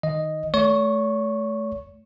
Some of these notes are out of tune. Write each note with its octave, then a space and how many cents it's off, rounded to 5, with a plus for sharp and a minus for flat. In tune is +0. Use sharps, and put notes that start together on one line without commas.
D#3 +0 D#5 +0
A3 -20 C#5 +40 C#6 -15